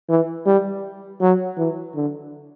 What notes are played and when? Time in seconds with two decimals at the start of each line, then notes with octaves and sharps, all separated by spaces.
0.09 E3
0.46 G3
1.21 F#3
1.57 E3
1.95 D3